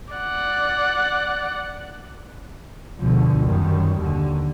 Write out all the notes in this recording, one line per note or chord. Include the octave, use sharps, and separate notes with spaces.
D5 F#5
G1 D2 B2 D3 F3
F#2 D#3 G3
D#2 D3